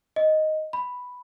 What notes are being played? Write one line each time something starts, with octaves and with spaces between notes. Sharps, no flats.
D#5
B5